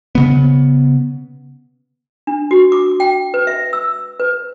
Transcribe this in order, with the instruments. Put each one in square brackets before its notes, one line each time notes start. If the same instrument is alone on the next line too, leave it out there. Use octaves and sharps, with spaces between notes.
[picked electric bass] C#3 B3
[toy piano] D4
F#4
D6
G5
B4
E5
E6
B4